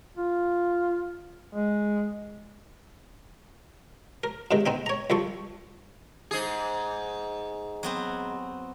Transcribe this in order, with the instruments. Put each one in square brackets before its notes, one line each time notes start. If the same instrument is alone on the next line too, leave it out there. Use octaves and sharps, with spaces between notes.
[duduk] F4
G#3
[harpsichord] A#4
G#2 C3 D#3
B3 C4 D#4
C#5 A#5
C2 F3 A4 C#6
[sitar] G#2 G#4
[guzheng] F#3 B3 C4